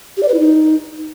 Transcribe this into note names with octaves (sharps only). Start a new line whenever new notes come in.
G4
D5
B4
E4
D#4